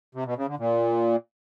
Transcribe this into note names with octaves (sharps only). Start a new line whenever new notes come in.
C3
B2
C#3
D3
A#2